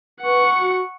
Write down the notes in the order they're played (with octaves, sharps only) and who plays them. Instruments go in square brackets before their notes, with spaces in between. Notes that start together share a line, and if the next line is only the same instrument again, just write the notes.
[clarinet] B4 [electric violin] F#5 C#6
[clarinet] F#4